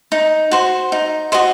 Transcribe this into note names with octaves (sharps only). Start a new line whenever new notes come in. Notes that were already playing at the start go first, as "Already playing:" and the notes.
D#4
F#4 C5
D#4
F#4 C5 D#5